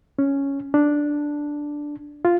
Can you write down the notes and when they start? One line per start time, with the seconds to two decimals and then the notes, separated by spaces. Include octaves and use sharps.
0.19 C#4
0.74 D4
2.25 F4